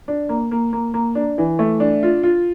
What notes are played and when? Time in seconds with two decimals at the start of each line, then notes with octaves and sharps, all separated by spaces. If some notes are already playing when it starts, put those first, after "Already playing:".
0.08 D4
0.29 A#3
0.51 A#3
0.73 A#3
0.94 A#3
1.15 D4
1.38 E3
1.59 A3
1.80 D4
2.03 F4
2.23 F4